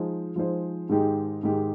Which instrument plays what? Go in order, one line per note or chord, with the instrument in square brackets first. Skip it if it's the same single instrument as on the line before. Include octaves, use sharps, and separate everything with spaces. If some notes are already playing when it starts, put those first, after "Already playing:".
Already playing: [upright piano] F3 G#3 D#4 G#4 C5
F3 G#3 D#4 G#4 C5
G#2 D#3 G#3 D#4 G4
G#2 D#3 G#3 D#4 G4